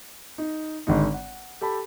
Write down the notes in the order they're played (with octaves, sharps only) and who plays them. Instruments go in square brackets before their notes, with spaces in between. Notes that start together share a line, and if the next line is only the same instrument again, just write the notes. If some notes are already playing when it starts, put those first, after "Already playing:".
[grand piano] D#4
G#1 D3 G#3 D#4
F#5
G4 A4 A5 B5